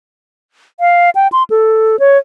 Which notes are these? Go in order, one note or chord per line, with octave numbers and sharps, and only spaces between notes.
F5
G5
C6
A4
C#5